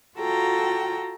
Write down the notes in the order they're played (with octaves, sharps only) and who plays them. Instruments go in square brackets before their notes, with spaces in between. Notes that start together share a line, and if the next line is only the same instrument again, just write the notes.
[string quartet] F4 F#4 A4 G5 A#5